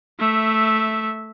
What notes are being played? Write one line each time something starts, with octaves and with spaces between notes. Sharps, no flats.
A3 E5